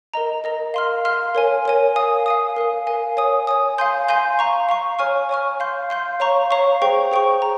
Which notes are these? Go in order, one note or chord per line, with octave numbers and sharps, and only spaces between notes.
A#4 D#5 A#5
A#4 D#5 A#5
F5 C6 F6
F5 C6 F6
A#4 C#5 G#5
A#4 C#5 G#5
F5 G#5 D#6
F5 G#5 D#6
A#4 F5 G#5
A#4 F5 G#5
C#5 G#5 D#6
C#5 G#5 D#6
F5 G#5 C6 G6
F5 G#5 C6 G6
F5 A#5 C#6
F5 A#5 C#6
C#5 G#5 C#6 F6
C#5 G#5 C#6 F6
F5 C6 G6
F5 C6 G6
C#5 F5 A#5 C#6
C#5 F5 A#5 C#6
G#4 C5 G5 C#6
G#4 C5 G5 C#6
A#5